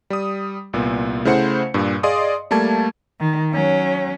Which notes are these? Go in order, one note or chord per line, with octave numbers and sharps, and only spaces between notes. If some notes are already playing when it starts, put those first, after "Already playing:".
G3 D#6
C2 A#2 B3
C#3 A3 E4 C5 F#5 C#7
G2 A#2
G#4 D5 D#5 F5 C6 D#6
G3 A3 A#3 A5 G#6
D#3
F#3 C#4